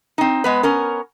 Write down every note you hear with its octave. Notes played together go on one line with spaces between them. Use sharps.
C4 D#4
G#3 B3 B4
B3 C#4 A#4